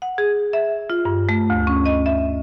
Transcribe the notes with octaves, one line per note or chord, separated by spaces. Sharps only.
F#5
G#4
E5
F4
G2
A3
D2
C#4
D#5
E5